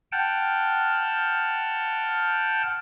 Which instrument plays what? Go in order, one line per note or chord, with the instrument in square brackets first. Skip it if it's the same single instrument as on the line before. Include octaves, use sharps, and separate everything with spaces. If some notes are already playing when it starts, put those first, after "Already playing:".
[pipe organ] F#5 G5 A5 F6 G6